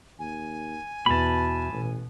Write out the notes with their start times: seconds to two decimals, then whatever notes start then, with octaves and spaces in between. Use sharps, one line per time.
0.19 D#2 G#5
1.06 E2 B2 A5 B5
1.72 A1 B2